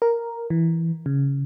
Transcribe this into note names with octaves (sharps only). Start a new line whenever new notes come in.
A#4
E3
C#3